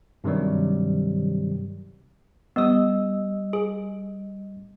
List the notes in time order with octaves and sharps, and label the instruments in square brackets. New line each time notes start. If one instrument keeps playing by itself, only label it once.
[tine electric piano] G2 C3 D#3 F#3 G3
[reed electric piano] G3 D#5 E6 [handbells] B3 D#6
[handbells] G#4